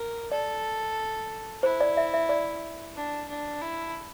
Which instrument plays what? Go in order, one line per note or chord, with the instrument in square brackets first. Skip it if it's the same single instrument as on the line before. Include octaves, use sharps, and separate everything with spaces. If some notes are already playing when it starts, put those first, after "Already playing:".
Already playing: [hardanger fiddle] A#4
[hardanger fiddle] A4 [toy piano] D5
[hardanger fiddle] E4 [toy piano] C5
[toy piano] D5
E5
E5
D5
[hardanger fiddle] D4
D4
E4